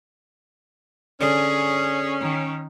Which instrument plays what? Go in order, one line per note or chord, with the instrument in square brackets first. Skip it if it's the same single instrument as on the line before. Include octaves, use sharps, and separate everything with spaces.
[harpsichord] D3 [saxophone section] C#4 [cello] G#4
[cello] D#3